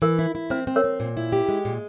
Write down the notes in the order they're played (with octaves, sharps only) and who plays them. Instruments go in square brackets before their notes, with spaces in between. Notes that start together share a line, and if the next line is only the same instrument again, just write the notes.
[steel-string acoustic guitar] E3 [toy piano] A#4
[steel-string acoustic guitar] E4
E4
[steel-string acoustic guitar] C4 [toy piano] C5
[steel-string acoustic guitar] C4
[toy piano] A#4 C#5
[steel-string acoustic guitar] C4
A#2
E4
G4
G#3
A#2